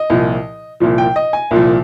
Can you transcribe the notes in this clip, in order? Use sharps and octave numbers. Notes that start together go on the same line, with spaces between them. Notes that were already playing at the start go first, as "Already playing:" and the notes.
Already playing: D#5
C2 A#2 F3
C2 A#2 F3
G5
D#5
G#5
C2 A#2 F3